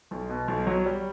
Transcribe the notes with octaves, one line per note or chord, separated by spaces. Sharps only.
B1
B2
B1
F#3
G3